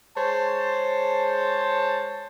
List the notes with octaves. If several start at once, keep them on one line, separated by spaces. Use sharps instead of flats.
G#3 C5 C#5 A5